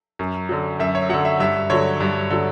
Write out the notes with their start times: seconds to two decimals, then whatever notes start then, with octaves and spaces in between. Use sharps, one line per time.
0.19 F#2
0.49 D3 F#3
0.80 F#2 E5
0.95 C#5
1.09 D3 F#3 F#5
1.25 E5
1.40 G2 E5
1.70 D3 F#3 C#5
2.00 G2
2.30 D3 F#3